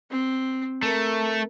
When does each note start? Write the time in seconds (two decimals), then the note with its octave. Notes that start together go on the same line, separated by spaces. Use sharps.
0.10 C4
0.82 A3 A#4